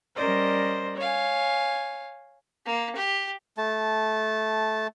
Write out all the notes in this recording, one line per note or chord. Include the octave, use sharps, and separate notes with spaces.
G3 C#4 A#4 C5 D5 D#5
C#5 F5 G#5
A#3
G4
A3 A5